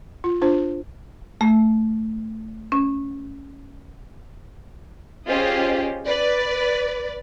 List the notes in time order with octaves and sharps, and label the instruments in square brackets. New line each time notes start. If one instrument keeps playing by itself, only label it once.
[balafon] F4
D4 F4 C5
[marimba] A3
C#4
[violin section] C#4 F4 G4 G#4 C5 D#5
B4 D5